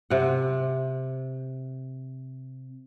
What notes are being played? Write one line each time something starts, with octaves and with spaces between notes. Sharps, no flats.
C3 F#5